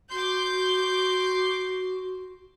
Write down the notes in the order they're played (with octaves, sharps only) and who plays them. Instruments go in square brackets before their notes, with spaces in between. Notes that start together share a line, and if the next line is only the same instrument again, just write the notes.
[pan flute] F#4 [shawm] C6 [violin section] D6 G6